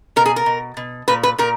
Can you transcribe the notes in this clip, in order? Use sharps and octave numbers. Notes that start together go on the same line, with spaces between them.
B2 A#4
G#4
A#4
B2
B2
A#2 B4
B4
A#2 A#4